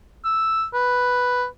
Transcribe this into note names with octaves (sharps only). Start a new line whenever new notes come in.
E6
B4